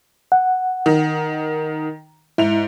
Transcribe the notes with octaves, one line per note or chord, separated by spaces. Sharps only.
F#5
D#3
G#2 E4 F7